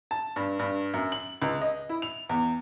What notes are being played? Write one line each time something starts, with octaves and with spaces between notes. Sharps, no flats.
A5
G2
G2
F#2
F#7
C#2
D#5
E4
F7
E2